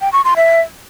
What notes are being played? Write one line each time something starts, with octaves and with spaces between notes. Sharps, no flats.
G5
C#6
C6
E5